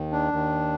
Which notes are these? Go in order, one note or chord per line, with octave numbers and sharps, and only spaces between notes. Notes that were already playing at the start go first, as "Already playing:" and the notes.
Already playing: D#2 D#3
D4
D#2 D#3